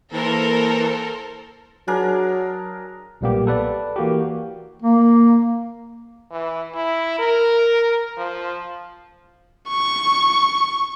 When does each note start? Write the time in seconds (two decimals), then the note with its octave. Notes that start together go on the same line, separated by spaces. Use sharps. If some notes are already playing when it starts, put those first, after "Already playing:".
0.13 E3 A#3 A4 A#4 C5
1.88 F#3 D4 G#4 A#4
3.21 B1 A#2 G3 A#3 B3 G4
3.47 A4 B4 D5
3.96 E3 A#3 F#4 G4
4.82 A#3
6.31 E3
6.74 E4
7.19 A#4
8.17 F3
9.69 C#6